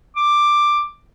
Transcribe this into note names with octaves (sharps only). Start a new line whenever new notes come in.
D6